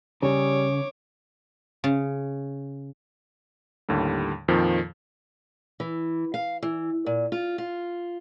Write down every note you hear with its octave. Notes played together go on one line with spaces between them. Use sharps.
C#3 G3 C#5 D6
C#3
D#2 A2 D3 G3
F2 A#2 D#3 F3
E3
F5
E3
A#2
F4
F4